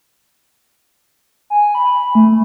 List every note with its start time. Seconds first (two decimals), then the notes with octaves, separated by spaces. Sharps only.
1.50 G#5
1.75 B5
2.15 A3